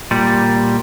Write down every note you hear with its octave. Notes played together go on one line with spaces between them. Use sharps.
A#2 G3